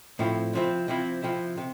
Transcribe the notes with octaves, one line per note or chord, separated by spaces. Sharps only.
A2 F3 C4 E4
C3 F3 C4 E4
C3 F3 C4 E4
C3 F3 C4 E4
C3